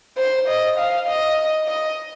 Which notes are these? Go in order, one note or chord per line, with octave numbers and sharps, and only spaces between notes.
C5
D#5
F5
D#5
D#5